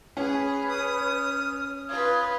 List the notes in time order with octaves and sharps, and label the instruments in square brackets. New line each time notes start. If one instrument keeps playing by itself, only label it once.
[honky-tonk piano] C#4 [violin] G#4 [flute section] B4 C#5
[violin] D#6 [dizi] F6
[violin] F4 B4 [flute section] D#6 G#6